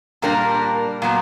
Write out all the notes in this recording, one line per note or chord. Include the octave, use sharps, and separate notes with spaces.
A#2 G3 A#3 D4 A#4
A#2 F#3 B3